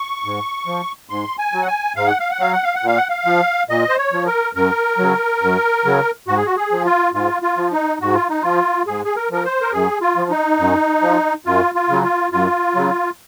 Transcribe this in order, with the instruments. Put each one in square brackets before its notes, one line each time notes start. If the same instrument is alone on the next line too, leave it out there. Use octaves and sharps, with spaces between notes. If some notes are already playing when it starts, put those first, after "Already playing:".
Already playing: [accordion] C#6
G#2
F3
G#2 C6
G#5
F#3
F#5
G#5
G#2 F5
F#5
F5
F#5
F#3 F5
F#5
F5
F#5
A#2 F5
F#5
F5
F3
A#2 D#5
C5
C#5
F3
A#4
F#2 A#4
C#3 F#3
F#2
C#3 F#3
G#2 F#4
G#4
F#4
G#4
F3
F4
G#2 F4
F4
F3
D#4
G#2 F#4
F4
D#4
F3 F4
G#2 G#4
G#4
A#4
F3 A#4
C5
A#4
F#2 G#4
F4
F3
D#4
F#2
F3
F#2 F4
F4
C#3 F#3
F4
F#2 F4
C#3 F#3